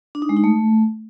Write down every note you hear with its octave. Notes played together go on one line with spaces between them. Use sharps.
D4
D#4
G#3
D#4
A3